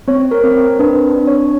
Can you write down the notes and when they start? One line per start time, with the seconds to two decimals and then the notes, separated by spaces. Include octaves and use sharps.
0.08 C4 C#5
0.31 A#4
0.44 C4
0.79 D4 B4
1.15 D4
1.27 C#5